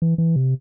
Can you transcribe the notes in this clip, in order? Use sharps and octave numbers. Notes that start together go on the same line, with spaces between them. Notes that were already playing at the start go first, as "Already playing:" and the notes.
E3
E3
C3